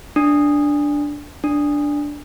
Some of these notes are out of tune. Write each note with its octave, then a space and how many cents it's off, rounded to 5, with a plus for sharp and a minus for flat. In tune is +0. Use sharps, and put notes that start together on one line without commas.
D4 -5
D4 -5